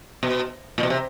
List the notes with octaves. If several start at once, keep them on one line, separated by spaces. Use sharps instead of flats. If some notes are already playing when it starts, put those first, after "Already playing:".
B2
A#2
B2
C3